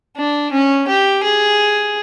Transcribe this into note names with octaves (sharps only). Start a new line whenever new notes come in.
D4
C#4
G4
G#4